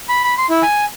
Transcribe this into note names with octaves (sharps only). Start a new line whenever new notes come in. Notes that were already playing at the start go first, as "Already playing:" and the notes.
B5
B5
C6
E4
G#5